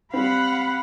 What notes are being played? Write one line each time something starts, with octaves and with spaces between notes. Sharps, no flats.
G3 C4 F5 F#5 B5